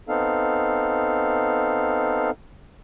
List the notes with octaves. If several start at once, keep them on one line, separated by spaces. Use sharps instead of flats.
B3 C4 D#4 A4 F5